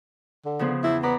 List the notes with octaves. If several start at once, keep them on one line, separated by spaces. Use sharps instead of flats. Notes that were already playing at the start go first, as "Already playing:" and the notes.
D3
C#3 F3 B3
E2 E4
B3 D5 A#5 B5